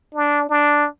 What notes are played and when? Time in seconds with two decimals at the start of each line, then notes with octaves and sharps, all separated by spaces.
0.14 D4
0.50 D4